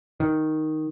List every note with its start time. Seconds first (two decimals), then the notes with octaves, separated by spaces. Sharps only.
0.20 D#3